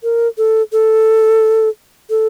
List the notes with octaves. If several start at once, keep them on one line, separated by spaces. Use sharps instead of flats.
A#4
A4
A4
A4